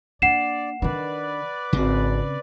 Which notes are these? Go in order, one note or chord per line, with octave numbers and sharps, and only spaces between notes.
A#3 D4 D5 F#5 C7 E7
D#3 D4 B4 D5
G#1 C#3 C4